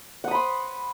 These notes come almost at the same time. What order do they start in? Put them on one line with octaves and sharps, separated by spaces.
F#5 D#6 B5 C6